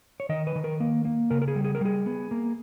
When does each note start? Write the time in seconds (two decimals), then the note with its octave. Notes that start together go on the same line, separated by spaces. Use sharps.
0.20 C#5
0.29 D#3 D#5
0.47 B4
0.55 D#3
0.64 A#4
0.80 A#3
1.05 A#3
1.31 C#3 A#4
1.42 A#4
1.48 G#4
1.56 G3
1.64 G#4
1.75 A#4
1.81 G3 G#4
2.06 B3
2.31 A#3